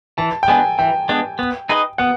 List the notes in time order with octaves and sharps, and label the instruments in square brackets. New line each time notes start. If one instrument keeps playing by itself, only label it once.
[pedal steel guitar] E3 [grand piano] A5
[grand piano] G5
[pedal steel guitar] G#3 B3 D4 [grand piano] G#5
[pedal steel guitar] E3 [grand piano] G5
[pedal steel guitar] G#3 B3 D4
B3
D#4 G#4 B4 D#5
[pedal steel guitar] B3 [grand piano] F#5